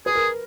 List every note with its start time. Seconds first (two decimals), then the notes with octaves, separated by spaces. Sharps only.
0.06 G#4 B4
0.15 A#4